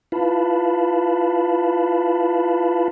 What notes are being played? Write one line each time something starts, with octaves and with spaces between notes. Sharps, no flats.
E4 F4 B4 F5 A5 B5